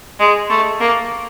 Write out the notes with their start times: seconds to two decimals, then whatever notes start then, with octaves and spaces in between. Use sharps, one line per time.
0.20 G#3
0.50 A3
0.80 A#3